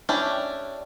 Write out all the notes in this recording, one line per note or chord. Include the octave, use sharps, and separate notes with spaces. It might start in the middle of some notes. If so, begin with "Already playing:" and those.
C#4 D4 E4 G4